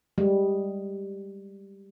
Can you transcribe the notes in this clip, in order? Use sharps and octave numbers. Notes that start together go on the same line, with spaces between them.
G3 G#3